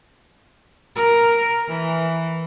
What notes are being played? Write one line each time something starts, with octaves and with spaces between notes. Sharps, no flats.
A#4
E3